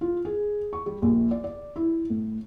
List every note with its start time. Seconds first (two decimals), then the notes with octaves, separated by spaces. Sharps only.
0.01 F4
0.25 G#4
0.73 C#6
0.86 G3
1.02 A#1
1.31 D5
1.44 D5
1.76 E4
2.10 A2